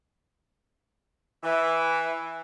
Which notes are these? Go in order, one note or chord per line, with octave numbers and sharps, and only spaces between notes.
E3